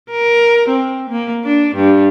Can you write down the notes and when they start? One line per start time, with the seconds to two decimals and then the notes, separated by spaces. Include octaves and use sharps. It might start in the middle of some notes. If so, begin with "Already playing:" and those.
0.11 A#4
0.69 C4
1.10 A#3
1.44 D4
1.75 G2